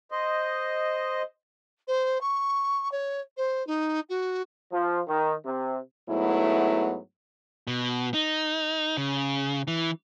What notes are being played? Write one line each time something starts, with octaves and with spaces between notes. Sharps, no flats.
C5 D#5
C5
C#6
C#5
C5
D#4
F#4
F3
D#3
C3
G#2 F#3 A3 B3 E4
B2
D#4
C#3
E3